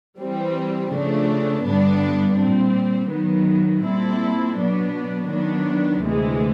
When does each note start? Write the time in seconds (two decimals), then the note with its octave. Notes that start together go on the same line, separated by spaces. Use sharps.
0.19 E3 G3 C4
0.91 C#3 F3 A3 D4
1.64 G2 D3 G3 B3 D4
2.38 A#2 G3 C4
3.10 D#3 F#3 B3
3.83 A#2 G3 C4 E4 A4
4.56 B2 F#3 B3 D4
5.29 D#3 F#3 B3 D4
6.02 D2 C3 E3 G#3